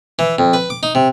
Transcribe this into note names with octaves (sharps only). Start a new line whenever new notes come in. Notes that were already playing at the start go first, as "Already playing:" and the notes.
E3
F2
B4
D6
D#4
C3